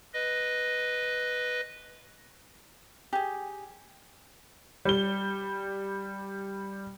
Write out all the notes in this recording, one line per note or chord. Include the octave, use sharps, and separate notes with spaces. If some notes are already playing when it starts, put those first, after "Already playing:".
B4 D#5
G4 G#4
G3 G7